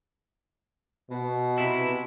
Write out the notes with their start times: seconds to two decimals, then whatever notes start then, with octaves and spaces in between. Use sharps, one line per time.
1.11 B2
1.58 C3 E4